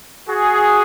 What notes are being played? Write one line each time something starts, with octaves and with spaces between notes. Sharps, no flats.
F#4 G#4